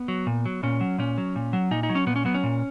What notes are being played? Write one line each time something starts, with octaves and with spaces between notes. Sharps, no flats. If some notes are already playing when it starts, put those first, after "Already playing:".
Already playing: B3
F#3
A#2
F#3
A#2 C#4
F#3
A#2 C#4
F#3
A#2
F#3
A#2 D#4
D#4
F#3
C#4
A#2 B3
C#4
F#3 B3
C#4
A#2